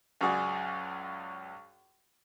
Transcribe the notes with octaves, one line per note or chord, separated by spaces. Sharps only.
C#2 F#2 F#4 G#4 D5